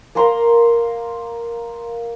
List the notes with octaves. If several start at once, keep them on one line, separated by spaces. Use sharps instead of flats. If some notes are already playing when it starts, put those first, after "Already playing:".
A#3 A#4 A#5 C6